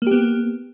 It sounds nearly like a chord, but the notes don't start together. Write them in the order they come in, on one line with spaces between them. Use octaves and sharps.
A#3 G4 B3